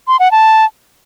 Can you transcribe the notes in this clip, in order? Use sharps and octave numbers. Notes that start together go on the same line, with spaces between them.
C6
F#5
A5